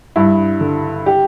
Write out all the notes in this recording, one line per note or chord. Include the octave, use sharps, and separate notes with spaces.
G2 E4
D3
G4